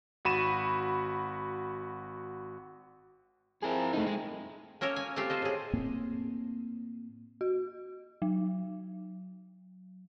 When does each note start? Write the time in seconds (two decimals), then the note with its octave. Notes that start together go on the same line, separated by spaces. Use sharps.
0.25 G#1 F#4 B5 D#7 E7
3.63 F3 C4 E4 G#4 A#4
3.93 A3 D#4
4.07 G#3
4.81 A#3 C#4 A4 A#4 C#5
4.96 G#5
5.16 A3 C4 F4 G4
5.30 A4 C5 D#5
5.42 A2 G#4
5.73 A2 A#3 C4
7.41 F#4
8.22 F#3